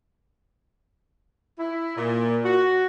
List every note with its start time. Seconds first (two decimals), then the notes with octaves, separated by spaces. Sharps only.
1.59 E4
1.97 A#2
2.45 F#4